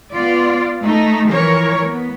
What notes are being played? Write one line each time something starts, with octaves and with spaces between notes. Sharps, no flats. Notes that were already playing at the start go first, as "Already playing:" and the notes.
B3 F4 D5
A3 D#4
E3 F3 A#4 C#5
B3